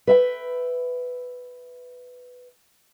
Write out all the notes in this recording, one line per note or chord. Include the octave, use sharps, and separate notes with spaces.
B4 E5 G5